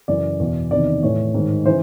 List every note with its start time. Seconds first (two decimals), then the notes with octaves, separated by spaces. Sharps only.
0.08 F#2 C#3 E3 D5
0.39 E2 B2
0.71 E2 C3 D#3 D5
1.03 A2 E3 C#5
1.34 G#2 D#3
1.65 C#3 E3 C5